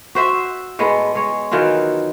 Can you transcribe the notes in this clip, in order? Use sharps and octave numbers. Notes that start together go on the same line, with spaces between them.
F#4 C5 E5
A2 G#3 B3
G#3 C#5
D#3 E3 F#3 F4